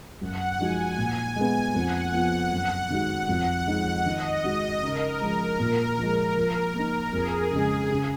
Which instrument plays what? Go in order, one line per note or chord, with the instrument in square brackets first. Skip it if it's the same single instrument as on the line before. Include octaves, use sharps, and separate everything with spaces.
[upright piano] F#2 [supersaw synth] F#5
[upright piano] F3 G#3 D#4 F#4 [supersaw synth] G#5
[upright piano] A#2
G#3 B3
[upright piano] F2 [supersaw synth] F#5
[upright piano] F3 B3 F4
F#2
D#3 G#3 D#4 F#4
[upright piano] F2 [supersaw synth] F#5
[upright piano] F3 G#3 D#4
[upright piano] D#3 [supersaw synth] D#5
[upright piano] G#3 D#4 F#4
[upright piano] C#3 [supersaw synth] A#4
[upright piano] F3 G#3
A#2
F3 G#3
F3
A#3 D#4
[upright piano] F2 [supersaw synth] G#4
[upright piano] C#3 G#3
C#3